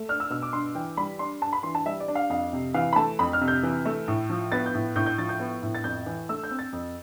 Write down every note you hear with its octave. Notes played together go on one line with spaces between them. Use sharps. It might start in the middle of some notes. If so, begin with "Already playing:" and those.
Already playing: A3
D4 F6
E6
B2 E6
D6
G2 C6
E3 G5
G3 B5
D4 C6
G2 A5
B5
E3 C6
A5
G3 E5
D5
D4
F5
F2 F5
C3
E3 F5
B5
A3 A5
F2 B5
F6
C3
G6
E3
A3
A2
F3
B3 A6
G6
A2
A2 G6
G6
F3 A6
G6
B3
A2
A6
F2 G6
E3
A3 E6
G6
C4
A6
F2